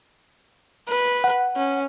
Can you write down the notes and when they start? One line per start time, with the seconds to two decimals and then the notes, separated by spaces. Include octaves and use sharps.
0.88 B4
1.24 F#5
1.56 C#4